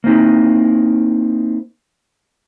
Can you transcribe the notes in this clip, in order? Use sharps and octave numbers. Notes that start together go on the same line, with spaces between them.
A#3 C4 D#4 E4